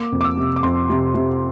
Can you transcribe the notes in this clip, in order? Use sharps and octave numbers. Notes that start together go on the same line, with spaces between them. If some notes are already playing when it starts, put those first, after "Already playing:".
Already playing: A#3 D6
F2
D6
E6
C3
D6
F2 C6
C3
C3